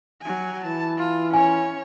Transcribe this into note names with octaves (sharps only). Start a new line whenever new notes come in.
F#3 G#5
E3 A5
F4
C#4 C#5 G#5